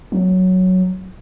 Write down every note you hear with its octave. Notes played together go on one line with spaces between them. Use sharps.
F#3